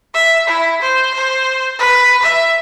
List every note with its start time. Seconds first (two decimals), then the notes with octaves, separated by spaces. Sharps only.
0.14 E5
0.47 E4
0.82 C5
1.14 C5
1.79 B4
2.23 E5